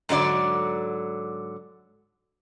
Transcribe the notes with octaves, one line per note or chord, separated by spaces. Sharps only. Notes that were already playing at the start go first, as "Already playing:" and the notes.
G#2 D3 F#3 D5